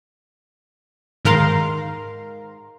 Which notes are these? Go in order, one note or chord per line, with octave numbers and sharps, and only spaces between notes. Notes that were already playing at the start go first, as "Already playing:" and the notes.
G#2 D#3 A#4 F5 A#5 C6